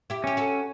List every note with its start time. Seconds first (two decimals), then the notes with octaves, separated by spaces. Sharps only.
0.10 E4 G4
0.24 C#4 G4
0.37 F#4 A4